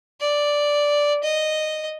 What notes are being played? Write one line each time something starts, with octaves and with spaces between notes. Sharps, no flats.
D5
D#5